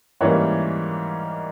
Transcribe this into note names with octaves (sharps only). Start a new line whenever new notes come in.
G#2 E3 G3 A#3 C#4 C#5